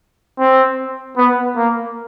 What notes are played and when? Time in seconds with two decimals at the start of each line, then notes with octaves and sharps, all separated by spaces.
0.39 C4
1.17 B3
1.57 A#3